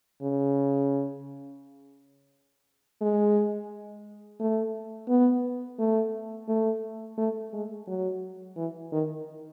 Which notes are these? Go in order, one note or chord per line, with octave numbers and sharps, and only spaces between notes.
C#3
G#3
A3
B3
A3
A3
A3
G#3
F#3
E3
D#3